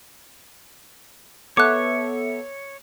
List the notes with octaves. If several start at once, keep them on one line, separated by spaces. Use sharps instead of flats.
B3 A4 C#5 E5 D6 F#6